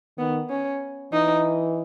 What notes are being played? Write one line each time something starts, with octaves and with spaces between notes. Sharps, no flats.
D#3 B3
C#4
E3 D#4